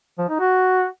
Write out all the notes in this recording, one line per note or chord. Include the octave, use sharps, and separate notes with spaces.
F3
D#4
F#4